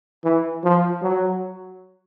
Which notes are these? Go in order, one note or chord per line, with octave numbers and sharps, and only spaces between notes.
E3
F3
F#3